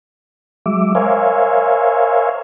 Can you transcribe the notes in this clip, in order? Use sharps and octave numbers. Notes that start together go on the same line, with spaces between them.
F#3 G#3 E5 D6
A#4 C5 C#5 E5 F5 G#5